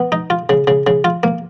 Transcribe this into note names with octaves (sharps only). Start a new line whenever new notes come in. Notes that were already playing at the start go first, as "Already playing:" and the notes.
Already playing: B3
D#4
F4
C#3
C#3
C#3
F4
A#3